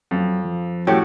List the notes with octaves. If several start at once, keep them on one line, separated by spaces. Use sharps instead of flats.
F2 F#3
F3
A2 F#4 G4 A4 C#5